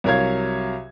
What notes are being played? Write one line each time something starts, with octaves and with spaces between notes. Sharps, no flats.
C2 F#3 A#4 C#5 F5 G#6